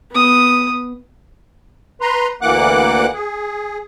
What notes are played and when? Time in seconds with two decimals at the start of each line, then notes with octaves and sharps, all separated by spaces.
0.12 B3 D#6
2.01 B4 A#5 C6
2.42 D2 E3 A#3 F#5 D6 F#6
3.14 G#4